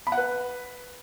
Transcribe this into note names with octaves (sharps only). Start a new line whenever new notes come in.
B5
F#5
B4